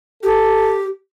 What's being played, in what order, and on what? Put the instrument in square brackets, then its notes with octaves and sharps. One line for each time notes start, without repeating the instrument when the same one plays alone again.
[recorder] G4 [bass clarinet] A4